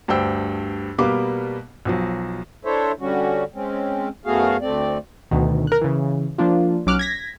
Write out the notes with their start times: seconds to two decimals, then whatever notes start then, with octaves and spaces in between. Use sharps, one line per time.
0.08 D2 G2 G4 C5 G5 E6
0.98 B2 G3 A#3 B3 F5 D6
1.85 B1 F3 F#3
2.65 D4 E4 A4 C5 C#5 E5
3.00 D3 G3 C#4 F#4
3.54 G#3 C4 C#4
4.26 F#2 A3 B3 F#4 G#4 F5
4.61 D2 A3 C4 D5
5.31 D2 B2 D#3
5.67 A#4 F#6
5.81 C#3 E3
6.38 F3 A#3 D4 F4
6.86 B1 F#3 C#4 D6 F6 F#6
6.99 G#6 A#6 B6